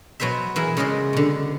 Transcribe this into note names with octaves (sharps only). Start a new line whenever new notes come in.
B2 F#3 B3 C5 E5
E3 E4 G#4 A#4
C#3 F#3 G#3 C5 D5 D#5
B2 D3